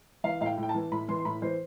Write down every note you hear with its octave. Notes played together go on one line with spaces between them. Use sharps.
E3 F5
A2 F5
G5
A2
G5
A5
E3
A2 B5
E3 C6
C6
A2 B5
E3 C5